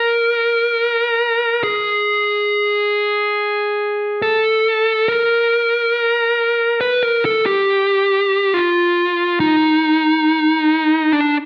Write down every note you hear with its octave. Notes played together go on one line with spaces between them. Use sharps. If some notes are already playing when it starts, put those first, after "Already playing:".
Already playing: A#4
G#4
A4
A#4
B4
A#4
A4
G4
F4
D#4
D4